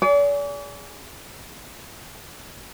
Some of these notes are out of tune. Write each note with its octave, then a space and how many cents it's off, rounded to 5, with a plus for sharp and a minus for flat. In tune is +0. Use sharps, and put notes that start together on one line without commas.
G#4 +0 D5 -40